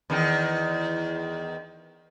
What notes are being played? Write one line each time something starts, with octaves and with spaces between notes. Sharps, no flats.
E2 D#3